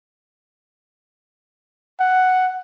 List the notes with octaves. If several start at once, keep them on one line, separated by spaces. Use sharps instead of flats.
F#5